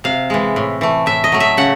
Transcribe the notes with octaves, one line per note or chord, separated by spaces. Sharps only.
C3 F5
E3 G#3
A2
E3 A3
A2 E5
D#5
F#3 A3
E5
C#3 F#5